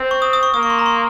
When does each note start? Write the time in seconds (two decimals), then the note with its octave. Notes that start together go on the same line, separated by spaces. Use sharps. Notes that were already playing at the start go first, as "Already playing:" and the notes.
Already playing: C4
0.11 C#6
0.22 D#6
0.33 D#6
0.43 C#6
0.54 A#3 D#6
0.63 C#6
0.70 C6
0.79 A#5
0.86 C6